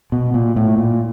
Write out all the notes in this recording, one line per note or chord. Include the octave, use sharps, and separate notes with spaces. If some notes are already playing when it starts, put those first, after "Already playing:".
B2
A#2
A2
A#2